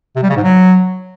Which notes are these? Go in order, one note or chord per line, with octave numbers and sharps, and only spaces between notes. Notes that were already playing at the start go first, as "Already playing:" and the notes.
C3
G3
C#3
G#2
F#3